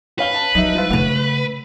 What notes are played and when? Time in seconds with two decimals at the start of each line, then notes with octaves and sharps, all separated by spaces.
0.19 C#4 B4 F5 G7
0.34 A5
0.55 F#3 G3 D#4 E5
0.75 F3 E4 F4
0.90 C#3 A3 F#5 F7